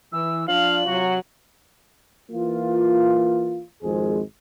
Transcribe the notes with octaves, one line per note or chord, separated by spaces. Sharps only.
E3 E6
F3 D4 F4 F5 F#7
C3 F#3 F#4
E3 A#3 F4
G#1 F2 G#3 G#4 C5